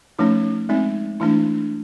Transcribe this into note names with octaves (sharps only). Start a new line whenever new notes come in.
F3 A3 C#4 D#4
G#3 C4 D#4
E3 A3 D4 E4